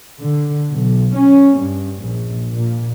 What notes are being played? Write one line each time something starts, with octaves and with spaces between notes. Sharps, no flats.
D3
B1
C#4
G2
A#1
A#2